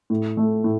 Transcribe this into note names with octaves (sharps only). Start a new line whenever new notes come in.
A2
A3
A2